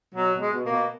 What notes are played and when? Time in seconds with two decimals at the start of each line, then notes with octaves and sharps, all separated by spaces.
0.15 B2 F#3
0.33 B2
0.40 G#3
0.53 B2
0.65 A#3
0.70 B2